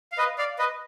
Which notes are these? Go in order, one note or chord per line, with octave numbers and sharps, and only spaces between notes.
F5
B4 D#5
D5 F5
B4 D#5